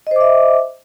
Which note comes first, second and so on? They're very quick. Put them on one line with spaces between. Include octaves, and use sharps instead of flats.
D#5 C5 D6 E5